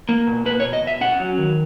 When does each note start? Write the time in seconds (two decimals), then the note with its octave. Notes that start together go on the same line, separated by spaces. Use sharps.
0.09 A#3
0.27 B2
0.46 A#3 B4
0.60 C#5
0.64 B2
0.73 D#5
0.83 B2 E5
1.01 C#4 F#5
1.19 F#3
1.38 D#3